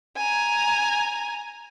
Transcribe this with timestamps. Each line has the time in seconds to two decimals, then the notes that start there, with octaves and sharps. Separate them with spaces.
0.17 G#5 A#5